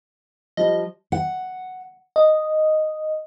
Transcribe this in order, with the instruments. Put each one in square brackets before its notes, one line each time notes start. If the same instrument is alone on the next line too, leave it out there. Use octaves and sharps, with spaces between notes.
[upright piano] F3 G3 [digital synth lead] D#5
[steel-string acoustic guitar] F#5
[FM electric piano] D#5